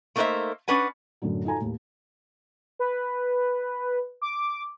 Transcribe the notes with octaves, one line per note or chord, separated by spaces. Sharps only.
A3 A#3 D#4 B4 C5 E5
C#4 D4 B4 F#5 G#5
F#2 A2 D3 F#3
D#4 F4 F#4 A4 G#5 A#5
D#2 A2
B4
D6